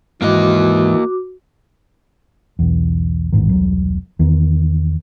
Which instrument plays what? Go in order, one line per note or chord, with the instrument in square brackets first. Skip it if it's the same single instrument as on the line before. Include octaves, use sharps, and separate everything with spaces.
[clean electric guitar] G#2 [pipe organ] E3 [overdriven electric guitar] A#3 D#5 [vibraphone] F#4 D6
[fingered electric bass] B1 E2
D#1 A1 G#2 D#3
E1 C2 F#3
E2 D#3